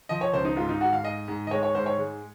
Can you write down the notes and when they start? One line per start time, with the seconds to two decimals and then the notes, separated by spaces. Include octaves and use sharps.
0.09 F3 D#5
0.21 C#5
0.33 C#2 C5
0.45 D#4
0.56 G#2 F4
0.69 D#4
0.80 G#2 F#4
0.93 F5
1.04 G#2 D#5
1.28 G#2
1.47 D#5
1.51 G#3 C#5
1.63 C#5
1.75 G#2 C5
1.86 C#5
1.98 G#3